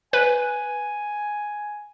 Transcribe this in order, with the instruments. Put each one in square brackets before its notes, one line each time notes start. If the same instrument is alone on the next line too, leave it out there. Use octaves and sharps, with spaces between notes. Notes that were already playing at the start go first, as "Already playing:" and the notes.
[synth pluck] B4 [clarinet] G#5